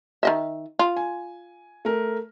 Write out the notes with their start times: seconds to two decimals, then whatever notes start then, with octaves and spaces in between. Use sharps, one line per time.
0.23 D#3 D#5 E5
0.79 F4
0.96 G#5
1.85 A3 A#4